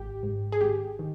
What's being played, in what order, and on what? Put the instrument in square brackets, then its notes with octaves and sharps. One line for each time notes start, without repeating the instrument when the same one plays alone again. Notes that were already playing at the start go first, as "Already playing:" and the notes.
Already playing: [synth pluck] G#1 G4
G#2
G#4
G#1 G4
D#3